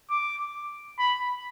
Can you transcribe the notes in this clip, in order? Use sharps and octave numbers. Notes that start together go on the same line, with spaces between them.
D6
B5